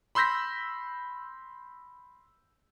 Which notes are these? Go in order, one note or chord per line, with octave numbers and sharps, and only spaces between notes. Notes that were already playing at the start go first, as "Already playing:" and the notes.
B5 C6 E6 G6 A#6 B6